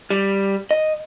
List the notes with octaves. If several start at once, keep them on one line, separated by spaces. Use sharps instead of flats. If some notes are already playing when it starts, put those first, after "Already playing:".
G3
D#5